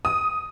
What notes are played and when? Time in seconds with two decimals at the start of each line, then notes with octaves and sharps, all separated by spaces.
0.05 D#6